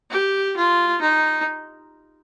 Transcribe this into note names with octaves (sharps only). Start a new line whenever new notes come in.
G4
F4
D#4